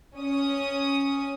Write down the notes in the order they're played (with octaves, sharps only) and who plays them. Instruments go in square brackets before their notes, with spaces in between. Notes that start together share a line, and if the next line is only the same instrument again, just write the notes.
[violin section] C#4 D#6